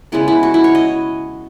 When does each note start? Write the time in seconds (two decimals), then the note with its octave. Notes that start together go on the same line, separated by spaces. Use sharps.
0.12 C#3 G#3 B3 E4
0.28 E4
0.43 F#4
0.54 E4
0.64 C#5
0.75 D#5